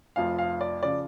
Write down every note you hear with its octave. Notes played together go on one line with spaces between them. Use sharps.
F1 F2 F3 F5
F5
D5
C#3 F3 D5